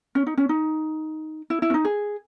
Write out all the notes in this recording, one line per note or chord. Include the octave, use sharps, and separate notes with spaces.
C#4
D#4
C#4
D#4
E4
E4
C#4
D#4
G#4